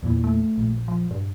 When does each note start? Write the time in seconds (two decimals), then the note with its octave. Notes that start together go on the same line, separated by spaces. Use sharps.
0.03 E2 A#2 E3
0.24 A3
0.58 A#1
0.88 F3
1.11 G2